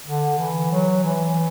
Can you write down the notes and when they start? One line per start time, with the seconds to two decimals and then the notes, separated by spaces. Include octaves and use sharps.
0.06 D3
0.39 E3
0.72 F#3
1.03 E3